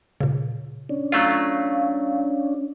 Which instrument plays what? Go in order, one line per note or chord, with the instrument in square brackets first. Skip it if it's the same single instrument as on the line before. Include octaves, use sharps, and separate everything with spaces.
[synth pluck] A#2 C#3
[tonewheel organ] C#4 D4
[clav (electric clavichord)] F#3 A3 F4 [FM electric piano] F5